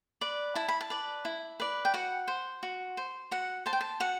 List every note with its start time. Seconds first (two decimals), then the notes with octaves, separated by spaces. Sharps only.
0.21 B4 D5
0.55 E4 A5
0.68 B5
0.81 A5
0.90 B4 D5
1.25 E4
1.60 B4 D5
1.85 G5
1.94 F#4 F#5
2.28 C5
2.63 F#4
2.97 C5
3.31 F#4 F#5
3.66 C5 A5
3.73 G5
3.81 A5
4.00 F#4 F#5